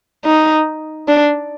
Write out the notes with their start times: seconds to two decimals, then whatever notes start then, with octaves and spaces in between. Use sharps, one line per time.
0.25 D#4
1.08 D4